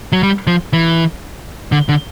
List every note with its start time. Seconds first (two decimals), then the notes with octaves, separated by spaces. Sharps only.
0.12 F#3
0.23 G3
0.47 F3
0.73 E3
1.72 D3
1.89 D3